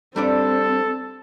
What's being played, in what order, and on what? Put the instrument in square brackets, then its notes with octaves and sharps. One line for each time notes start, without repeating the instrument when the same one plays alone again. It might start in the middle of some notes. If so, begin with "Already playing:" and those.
[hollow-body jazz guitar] G3 D4 D5 [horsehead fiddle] C4 [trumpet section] A4